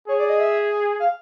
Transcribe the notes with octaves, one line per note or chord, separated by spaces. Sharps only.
G#4 C#5
D5
D#5
E5
F5